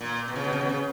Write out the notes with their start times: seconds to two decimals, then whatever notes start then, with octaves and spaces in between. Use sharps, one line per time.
0.01 A#2
0.28 B2
0.36 C#3
0.44 B2
0.53 C#3
0.61 B2
0.69 C#3